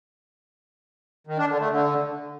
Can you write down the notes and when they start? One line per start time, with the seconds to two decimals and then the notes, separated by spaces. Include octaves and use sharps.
1.27 D#3
1.38 D4
1.49 D3
1.60 A3
1.71 D3